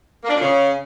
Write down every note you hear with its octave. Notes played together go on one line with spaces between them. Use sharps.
A#3
D4
A#2
C#3